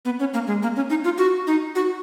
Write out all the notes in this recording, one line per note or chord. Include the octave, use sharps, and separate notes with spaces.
B3
C#4
A#3
G#3
A#3
C#4
D#4
F4
F#4
D#4
F#4